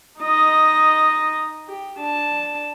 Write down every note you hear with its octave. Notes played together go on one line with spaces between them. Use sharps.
D#4 D#5
G4
D4 A5